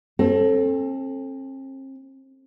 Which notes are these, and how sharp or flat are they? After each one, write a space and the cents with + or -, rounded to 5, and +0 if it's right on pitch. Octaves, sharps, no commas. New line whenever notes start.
C4 +40 A4 -5